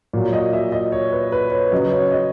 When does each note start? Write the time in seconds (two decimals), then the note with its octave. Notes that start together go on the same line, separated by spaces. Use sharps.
0.13 A#2 F#3
0.33 D#5
0.53 E5
0.72 D#5
0.92 C#5
1.12 B4
1.32 B4
1.51 C#5
1.72 C#3 F#3 D#5
1.92 C#5
2.11 D#5